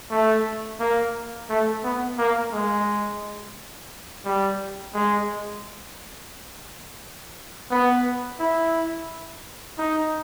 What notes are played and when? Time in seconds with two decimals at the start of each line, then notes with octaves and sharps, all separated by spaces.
0.11 A3
0.80 A#3
1.49 A3
1.83 B3
2.18 A#3
2.53 G#3
4.25 G3
4.94 G#3
7.71 B3
8.39 E4
9.78 D#4